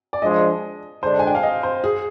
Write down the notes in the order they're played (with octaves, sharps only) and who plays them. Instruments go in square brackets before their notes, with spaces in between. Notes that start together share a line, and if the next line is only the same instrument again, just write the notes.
[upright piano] D5
[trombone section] F3 G#3 D4 [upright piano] D#5
[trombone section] D3 G#3 D4 [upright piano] C5
[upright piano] G#5
G5
F5
D#5
C5
G#4